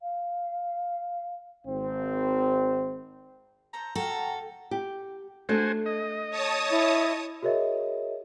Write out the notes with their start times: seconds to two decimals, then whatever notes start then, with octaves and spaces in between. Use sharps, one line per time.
0.02 F5
1.67 G#1 C4
3.73 A4 C5 A#5
3.95 F#4 A4 F5 G5 A#5
4.71 G4
5.49 A3 D4 F#4 C5 G#5
5.86 D#5
6.30 C#5 A5 D#6
6.72 E4
7.42 F#4 G#4 A#4 C#5 D#5 E5